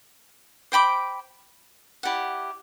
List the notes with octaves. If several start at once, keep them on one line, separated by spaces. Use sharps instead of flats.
C5 G5 B5 D6
E4 G4 D5 F#5